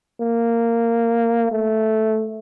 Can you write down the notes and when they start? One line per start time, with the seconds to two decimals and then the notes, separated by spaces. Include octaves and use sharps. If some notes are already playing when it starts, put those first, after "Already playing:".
0.20 A#3
1.52 A3